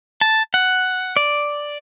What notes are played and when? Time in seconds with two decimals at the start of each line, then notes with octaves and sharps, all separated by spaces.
0.21 A5
0.54 F#5
1.17 D5